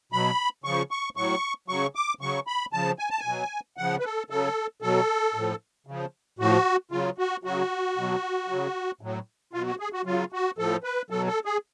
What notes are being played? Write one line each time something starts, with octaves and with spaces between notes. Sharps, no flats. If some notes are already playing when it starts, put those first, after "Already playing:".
B2 F#3 B5
C#3 F3 C#6
C#6
A2 F#3 C#6
C#3 F#3 C#6
D6
C#3 F#3 C#6
B5
C#3 F3 A5
G#5
A5
G#5
B2 F#3
C#3 F3 F#5
B4
A4
C#3 F#3 A4
B2 F#3 A4
A2 F3
C#3 F3
A2 F3 F#4
C#3 F#3 F4
F#4
C#3 F#3 F#4
B2 F#3
C#3 F#3
A2 F#3
B2 F#3 F4
F#4
G#4
F#4
C#3 F#3 F4
F#4
A2 F3 A4
B4
B2 F#3 A4
A4
G#4